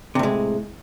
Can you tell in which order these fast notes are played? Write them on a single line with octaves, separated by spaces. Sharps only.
C3 A2 G#3